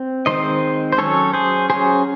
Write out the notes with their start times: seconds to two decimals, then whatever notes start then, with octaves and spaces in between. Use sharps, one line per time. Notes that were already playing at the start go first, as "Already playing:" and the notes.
Already playing: C4
0.26 D#3 G#3 C4 C5 D#5
0.93 C5
0.98 F#3 C#4 A4 C#5
1.33 G#4 C5
1.70 F#3 C#4 G#4 C5